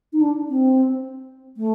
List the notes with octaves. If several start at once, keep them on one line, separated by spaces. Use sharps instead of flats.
D#4
D4
C4
A3